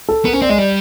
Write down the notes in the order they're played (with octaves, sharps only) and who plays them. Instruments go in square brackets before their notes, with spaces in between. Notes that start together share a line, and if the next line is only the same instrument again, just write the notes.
[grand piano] A4
[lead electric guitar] B3 [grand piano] A#4
[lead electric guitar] C#4 [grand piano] C5
[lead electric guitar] C4 [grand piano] D5
[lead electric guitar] G#3 [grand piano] D#5
[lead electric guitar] G3 [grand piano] D5